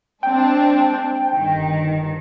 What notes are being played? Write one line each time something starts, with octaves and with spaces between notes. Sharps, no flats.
G#3 C4 D4 G5
G1 D#3